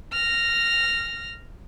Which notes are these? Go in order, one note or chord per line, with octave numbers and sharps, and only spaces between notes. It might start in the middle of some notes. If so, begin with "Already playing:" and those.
F6 A#6